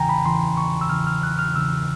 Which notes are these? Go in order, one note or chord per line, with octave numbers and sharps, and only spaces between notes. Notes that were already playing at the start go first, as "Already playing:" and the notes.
Already playing: E2 C#3 E3 G5 G#5 A#5
B5
E2 C#3 E3 C6
C#6
E6
E2 C#3 E3 F6
F6
F#6
F6
E2 C#3 E3 E6